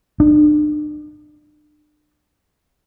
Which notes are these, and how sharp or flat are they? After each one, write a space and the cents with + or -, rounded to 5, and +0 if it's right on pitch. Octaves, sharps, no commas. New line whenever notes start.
D4 +40